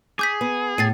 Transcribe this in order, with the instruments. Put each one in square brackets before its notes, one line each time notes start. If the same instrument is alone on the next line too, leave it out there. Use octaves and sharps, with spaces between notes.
[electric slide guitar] G#4 [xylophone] D6 G6 B6
[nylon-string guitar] B3
[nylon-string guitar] A2 [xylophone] A6 C7 D#7